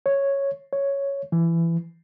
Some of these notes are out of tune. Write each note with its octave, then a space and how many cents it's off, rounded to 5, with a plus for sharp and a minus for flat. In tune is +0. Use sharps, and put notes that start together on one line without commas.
C#5 -5
C#5 +0
E3 +20